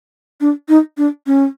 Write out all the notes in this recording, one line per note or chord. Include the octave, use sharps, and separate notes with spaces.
D4
D#4
D4
C#4